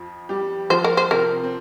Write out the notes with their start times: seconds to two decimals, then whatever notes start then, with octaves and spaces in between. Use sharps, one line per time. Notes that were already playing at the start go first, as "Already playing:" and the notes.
Already playing: F2 F3
0.29 G3 G4
0.70 F3 F4 C5
0.84 A#4
0.97 C5
1.11 C3 C4 A#4
1.44 C4